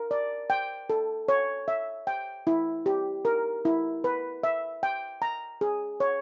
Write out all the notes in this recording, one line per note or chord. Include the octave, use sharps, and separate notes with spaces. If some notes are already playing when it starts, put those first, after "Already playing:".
Already playing: A#4
D5
G5
A4
C#5
E5
G5
E4
G4
A#4
E4
B4
E5
G5
A#5
G#4
C#5